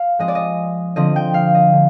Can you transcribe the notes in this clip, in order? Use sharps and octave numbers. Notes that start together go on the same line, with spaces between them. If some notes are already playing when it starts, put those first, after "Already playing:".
Already playing: F5
F3 G#3 C4 D#5
D5
D#5
D3 F3 C4 D#5
G5
F5
D#5
D3